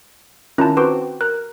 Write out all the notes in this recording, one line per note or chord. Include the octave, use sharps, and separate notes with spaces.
D#3 C#4 E4 F4 A5 A#5
C4 F#4 B4 G5 C6 D6
A#4 F#6